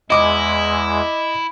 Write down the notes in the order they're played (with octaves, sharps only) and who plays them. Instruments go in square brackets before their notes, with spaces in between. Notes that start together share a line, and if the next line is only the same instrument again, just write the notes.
[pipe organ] E2 G#3 [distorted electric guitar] E4 [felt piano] D#5 D6 D#6